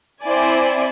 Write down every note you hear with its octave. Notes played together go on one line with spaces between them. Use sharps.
C4 E4 C5 D5 G#5